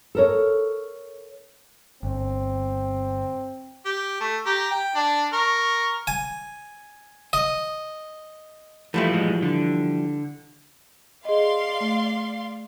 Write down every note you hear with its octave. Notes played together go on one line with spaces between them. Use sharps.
A4 A#4 C#5
G1 C4
G4
A3
G4 A#5
G5
D4
A#4 C#6
G#5
D#5
E3 F3 G3 A3
A2 G#3
D3
G#4 D5 D#5 F5 C6
A3